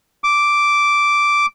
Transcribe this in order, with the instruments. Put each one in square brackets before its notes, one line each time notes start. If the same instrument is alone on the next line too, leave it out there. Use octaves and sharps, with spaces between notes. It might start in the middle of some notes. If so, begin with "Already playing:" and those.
[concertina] D6